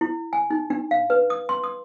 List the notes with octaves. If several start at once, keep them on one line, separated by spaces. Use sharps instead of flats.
E4
G#5
D#4
D4
F5
B4
D#6
C6
D#6